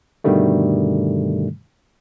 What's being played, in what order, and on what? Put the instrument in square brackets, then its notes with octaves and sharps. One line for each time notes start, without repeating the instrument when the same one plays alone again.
[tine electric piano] G2 B2 D3 D#3 G3 A3